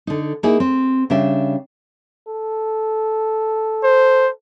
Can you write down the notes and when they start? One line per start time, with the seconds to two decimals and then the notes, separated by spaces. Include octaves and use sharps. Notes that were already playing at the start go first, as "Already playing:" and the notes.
0.07 D3 D#4
0.43 A#3 D#4 E4 G#4
0.60 C4
1.10 C#3 G3 D4 E5 G5
2.28 A4
3.84 C5